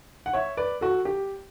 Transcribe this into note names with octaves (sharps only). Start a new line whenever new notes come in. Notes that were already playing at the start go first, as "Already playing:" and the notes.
F#5
C#5 E5
B4 D5
F#4 A4
G4